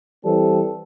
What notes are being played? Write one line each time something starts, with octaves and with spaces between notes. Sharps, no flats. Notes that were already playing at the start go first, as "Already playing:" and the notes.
E3 G3 C4 A4